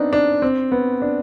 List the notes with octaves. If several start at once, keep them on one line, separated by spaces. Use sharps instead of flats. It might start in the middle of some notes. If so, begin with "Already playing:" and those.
Already playing: B3 C4 D4 D#4
D4
C4
B3
D4